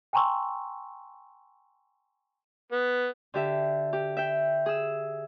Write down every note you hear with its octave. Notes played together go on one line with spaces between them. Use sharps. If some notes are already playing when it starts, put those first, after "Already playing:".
G5 G#5 A#5 C6 C#6 E6
B3
D3 G4 E5
G4
E5 G5
G#4 E6